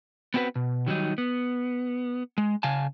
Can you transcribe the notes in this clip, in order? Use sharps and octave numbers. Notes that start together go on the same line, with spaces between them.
B3 C4 F#4 A4 B4
B2
D#3 F#3 G3 D#4
B3
G#3
C#3 F5 G#5 A5